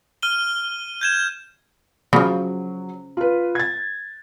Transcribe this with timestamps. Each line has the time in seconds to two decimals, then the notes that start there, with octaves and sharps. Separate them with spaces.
0.22 F6 D#7 G7
1.01 G6 G#6 E7
2.13 C#3 F3 F#3
3.17 F4 B4
3.55 G#6 A6